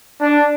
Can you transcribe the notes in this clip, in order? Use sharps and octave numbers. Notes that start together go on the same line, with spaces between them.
D4